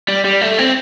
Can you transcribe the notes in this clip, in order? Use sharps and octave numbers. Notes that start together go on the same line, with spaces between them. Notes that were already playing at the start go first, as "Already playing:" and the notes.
G3
G3
A3
C4